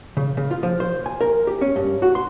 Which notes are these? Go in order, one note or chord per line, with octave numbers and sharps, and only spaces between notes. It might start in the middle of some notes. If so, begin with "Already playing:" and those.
C#3
C#3
F4
F3
C5
G#5
A#4
G4
C#4
G2
F#4
C6